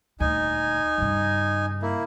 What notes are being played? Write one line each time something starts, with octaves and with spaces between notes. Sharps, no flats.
D#1 D2 D#4 G#5
G2 C#3
A#3 E4